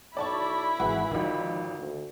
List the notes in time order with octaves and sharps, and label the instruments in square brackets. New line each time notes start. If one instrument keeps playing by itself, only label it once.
[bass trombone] B1 [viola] E4 B5 [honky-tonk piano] D5 A5 C#6
[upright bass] G#1 [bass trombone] E3 [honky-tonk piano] F#4 G#4
[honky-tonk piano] G#1 F2 [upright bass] D3 [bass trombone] D#3
[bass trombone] D2